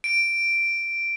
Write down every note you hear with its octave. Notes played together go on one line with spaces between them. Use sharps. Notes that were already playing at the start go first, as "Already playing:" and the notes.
D7